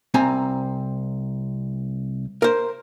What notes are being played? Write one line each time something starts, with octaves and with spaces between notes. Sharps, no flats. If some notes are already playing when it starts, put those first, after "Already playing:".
C2 C4 G#5 A#5
A#4 C5